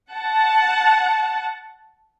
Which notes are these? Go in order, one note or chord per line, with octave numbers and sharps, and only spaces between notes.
F#5 A5